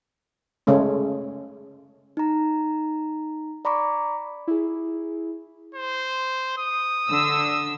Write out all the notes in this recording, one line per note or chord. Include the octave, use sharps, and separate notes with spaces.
C#3 G#3 A3 C#4
D#4 A#5
D5 A#5 B5 C#6 D6
E4 G#4
C5
D#6
D3 E6